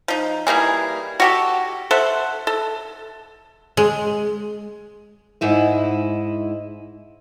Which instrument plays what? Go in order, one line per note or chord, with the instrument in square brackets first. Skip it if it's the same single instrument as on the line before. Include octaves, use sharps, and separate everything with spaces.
[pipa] F3 D#4
E3 G3 A#3 G#4
F#4 G4 A4
A4 C5 E5 F#5
A4
[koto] G#3
[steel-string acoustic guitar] G#2 E4 D#5